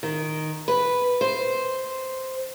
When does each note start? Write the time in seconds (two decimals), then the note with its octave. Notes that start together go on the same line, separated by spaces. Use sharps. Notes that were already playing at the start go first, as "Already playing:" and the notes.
0.03 D#3
0.68 B4
1.21 C5